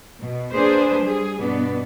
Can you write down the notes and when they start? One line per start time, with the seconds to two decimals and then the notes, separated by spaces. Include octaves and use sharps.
0.20 B2
0.52 A#3 D4 G#4 B4 C5
1.00 G3 G#4
1.40 G2 B2 B3 D4